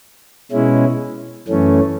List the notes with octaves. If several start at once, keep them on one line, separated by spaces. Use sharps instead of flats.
B2 G#3 C#4 E4
F#2 E3 A3 C#4